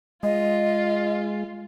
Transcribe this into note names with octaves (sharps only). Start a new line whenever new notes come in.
G#3 F4 D#5